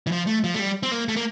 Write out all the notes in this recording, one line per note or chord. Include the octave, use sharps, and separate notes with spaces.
E3
F3
A3
F3
A3
G3
C4
A#3
A3
A#3